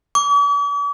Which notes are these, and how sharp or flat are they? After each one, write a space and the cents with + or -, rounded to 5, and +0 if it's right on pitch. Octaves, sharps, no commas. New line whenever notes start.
D6 -45